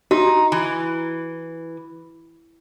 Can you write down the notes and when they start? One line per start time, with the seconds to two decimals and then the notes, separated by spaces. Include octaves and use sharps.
0.11 D#4 F#4
0.52 E3